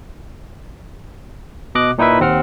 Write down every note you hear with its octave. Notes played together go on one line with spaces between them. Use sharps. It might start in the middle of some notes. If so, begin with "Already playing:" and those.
B2 D#5 D6 F#6
A#2 D#4 E4 B4 E5
D#2 C4 F#5 F6